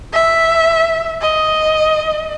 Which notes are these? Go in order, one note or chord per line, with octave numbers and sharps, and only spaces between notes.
E5
D#5